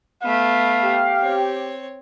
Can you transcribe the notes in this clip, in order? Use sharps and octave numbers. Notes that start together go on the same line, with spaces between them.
A3 B3 F5
G4
C4 C#5